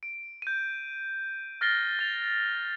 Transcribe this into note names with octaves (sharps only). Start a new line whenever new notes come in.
D7
G6 D#7
F6 A6 A#6 C7 G7
A6 F7